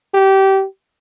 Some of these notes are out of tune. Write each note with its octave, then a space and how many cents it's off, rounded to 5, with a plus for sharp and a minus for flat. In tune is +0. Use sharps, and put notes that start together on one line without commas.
G4 -20